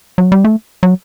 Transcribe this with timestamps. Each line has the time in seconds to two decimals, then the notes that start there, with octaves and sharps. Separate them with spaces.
0.18 F#3
0.32 G3
0.45 A3
0.83 F#3